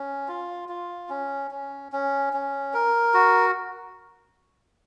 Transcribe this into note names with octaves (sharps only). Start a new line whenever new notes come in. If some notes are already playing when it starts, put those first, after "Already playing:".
Already playing: C#4
F4
F4
C#4
C#4
C#4
C#4
A#4
F#4